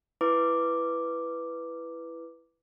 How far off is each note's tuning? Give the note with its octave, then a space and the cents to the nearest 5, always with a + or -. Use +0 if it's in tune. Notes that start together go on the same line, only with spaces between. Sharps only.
E4 +15 B4 +0 D6 +0